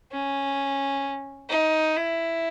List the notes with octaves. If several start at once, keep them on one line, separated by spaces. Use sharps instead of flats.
C#4
D#4
E4